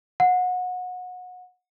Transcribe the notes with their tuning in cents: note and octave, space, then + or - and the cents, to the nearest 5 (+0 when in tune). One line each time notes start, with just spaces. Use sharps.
F#5 -25